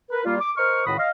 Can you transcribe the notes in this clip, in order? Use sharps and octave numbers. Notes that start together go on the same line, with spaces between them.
A#4 B4
G3 A#3 F4
D6
A#4 C5 D#5 C#6 F6
C#2 A2 D#3 F#4 B5 D#6
D#5 F5